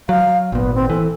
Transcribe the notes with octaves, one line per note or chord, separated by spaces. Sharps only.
F#3 F5
G#1 A#2 B3
C4
E3 A4